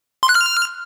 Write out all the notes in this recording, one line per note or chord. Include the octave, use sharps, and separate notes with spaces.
C6
F#6
F6